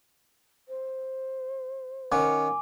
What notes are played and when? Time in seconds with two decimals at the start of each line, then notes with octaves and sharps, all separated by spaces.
0.68 C5
2.12 D#3 C#4 F#5 G#5 D6